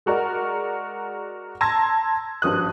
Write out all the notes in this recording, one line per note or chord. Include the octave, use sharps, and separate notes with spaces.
G#3 F#4 A#4 D5 F#5
A5 A#5 C6 E6 G#6 A#6
G#1 G2 F3 D#6 F#6